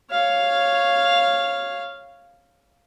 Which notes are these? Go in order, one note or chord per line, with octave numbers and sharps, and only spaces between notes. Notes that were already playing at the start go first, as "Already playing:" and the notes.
C#5 F5